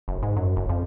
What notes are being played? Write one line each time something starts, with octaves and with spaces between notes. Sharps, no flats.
F#1
G#2
F#2
F#1
F2